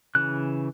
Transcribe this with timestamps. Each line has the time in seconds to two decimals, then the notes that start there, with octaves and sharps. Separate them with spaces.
0.15 C#3 E3 F#6